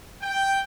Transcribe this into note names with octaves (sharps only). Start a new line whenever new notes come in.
G5